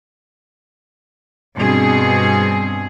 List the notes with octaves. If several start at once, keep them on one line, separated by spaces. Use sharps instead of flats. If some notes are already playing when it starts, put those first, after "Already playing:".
G2 B2 C4 G#4